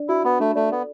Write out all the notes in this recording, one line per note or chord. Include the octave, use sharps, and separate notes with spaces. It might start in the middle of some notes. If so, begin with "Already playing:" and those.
Already playing: D4 D5
E4 F#4
B3 B5
A3 D4
A3 D5
B3 A4